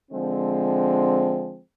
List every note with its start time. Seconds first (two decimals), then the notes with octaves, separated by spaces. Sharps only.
0.11 D3 F3 G#3 C4